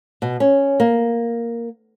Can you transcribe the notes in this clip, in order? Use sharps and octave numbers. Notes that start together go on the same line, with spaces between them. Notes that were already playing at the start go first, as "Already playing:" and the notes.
B2
C#4
A#3